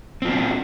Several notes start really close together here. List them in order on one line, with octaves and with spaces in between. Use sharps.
C4 F4 B3 D4